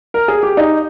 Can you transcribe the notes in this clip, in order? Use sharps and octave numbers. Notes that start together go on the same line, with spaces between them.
A#4
G#4
G4
D#4